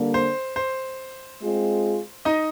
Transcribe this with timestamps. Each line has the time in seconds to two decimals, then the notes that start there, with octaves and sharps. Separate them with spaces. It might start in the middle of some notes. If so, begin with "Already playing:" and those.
Already playing: D3 G3 A#3
0.14 C5
0.56 C5
1.41 G#3 C4 F4 G#4
2.25 D#4 D#5